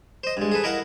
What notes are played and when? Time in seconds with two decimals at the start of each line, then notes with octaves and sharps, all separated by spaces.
0.24 C5 D#5
0.37 G2 G#3
0.52 G#4 A4 B4
0.63 E4 A#4 D#5 F5 F#5